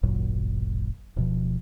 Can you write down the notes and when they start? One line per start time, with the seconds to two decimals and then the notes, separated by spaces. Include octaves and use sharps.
0.03 D1 G#1 F#2 A#2
1.16 D1 B2 F3